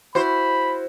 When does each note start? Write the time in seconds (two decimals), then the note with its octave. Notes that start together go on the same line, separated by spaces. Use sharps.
0.15 E4 F#4 C5 B5